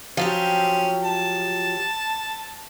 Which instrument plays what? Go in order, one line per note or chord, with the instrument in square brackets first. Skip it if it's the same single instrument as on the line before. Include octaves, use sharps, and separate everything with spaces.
[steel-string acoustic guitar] F3 F#3 G4 [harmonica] C4 C#4
[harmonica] A5